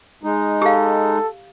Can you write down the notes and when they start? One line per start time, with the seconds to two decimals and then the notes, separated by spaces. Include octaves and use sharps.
0.24 G#3 D#4
0.62 G4 A4 F5